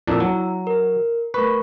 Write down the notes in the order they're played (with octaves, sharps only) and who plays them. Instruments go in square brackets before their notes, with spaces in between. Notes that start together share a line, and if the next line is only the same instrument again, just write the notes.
[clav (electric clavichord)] F2 A#2 D4 [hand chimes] E4 A#5 E6
[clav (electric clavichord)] F#3 [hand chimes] A#5
[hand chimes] A#4
[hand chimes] A3 A#4 C#6 [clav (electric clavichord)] B4